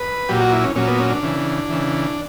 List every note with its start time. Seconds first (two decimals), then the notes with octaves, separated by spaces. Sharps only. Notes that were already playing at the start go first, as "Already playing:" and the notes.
Already playing: B4
0.29 A#2 F#3 G4
0.41 F#4
0.52 E4
0.64 C#4
0.76 A#2 F#3 C#4
0.88 B3
0.99 C#4
1.10 D4
1.23 C#3 E3
1.69 C#3 E3